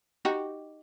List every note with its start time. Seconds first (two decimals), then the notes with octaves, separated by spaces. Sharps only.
0.25 D#4 F#4 G4